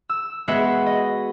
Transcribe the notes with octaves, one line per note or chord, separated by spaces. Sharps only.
E6
G#3 B3 F#4 B4 E5
D#5